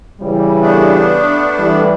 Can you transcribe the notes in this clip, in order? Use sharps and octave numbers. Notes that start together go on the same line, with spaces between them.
C#3 E3 G3
A3 B3 D4
E3 G3